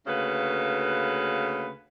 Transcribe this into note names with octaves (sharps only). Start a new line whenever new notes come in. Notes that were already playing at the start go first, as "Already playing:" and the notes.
D2 C#3 A#3 B4